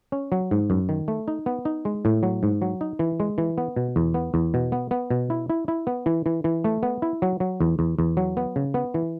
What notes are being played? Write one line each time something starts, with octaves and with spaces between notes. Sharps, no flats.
C#4
F#3
G#2
F#2
D#3
A3
D#4
B3
D#4
G#3
A2
F#3
G#2
F#3
D#4
E3
G#3
E3
B3
B2
E2
B3
E2
B2
B3
B3
B2
E4
E4
E4
B3
E3
E3
E3
A3
B3
E4
F#3
F#3
E2
E2
E2
F#3
B3
C#3
B3
E3